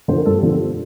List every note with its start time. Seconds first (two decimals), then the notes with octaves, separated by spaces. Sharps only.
0.08 D3 C5
0.12 F3
0.17 A#4
0.26 G2 A4
0.37 G4
0.43 D3 F3 A4